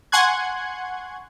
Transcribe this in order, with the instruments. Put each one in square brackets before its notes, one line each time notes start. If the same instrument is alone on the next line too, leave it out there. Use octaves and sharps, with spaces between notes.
[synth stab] F#5 G#5 C6 C#6 F#6 G#6